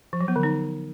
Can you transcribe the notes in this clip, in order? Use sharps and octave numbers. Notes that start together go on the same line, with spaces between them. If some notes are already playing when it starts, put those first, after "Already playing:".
F3
F#3
B3
D3
D#4